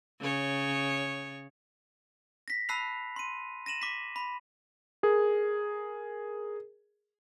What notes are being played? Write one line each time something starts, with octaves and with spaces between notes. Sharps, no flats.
C#3 C#5
A#6 B6
A5 B5 E6 F#6 C7 F7
C6 D#7
A#6 D#7 E7 F#7
D6 B6
B5
G#4 A#4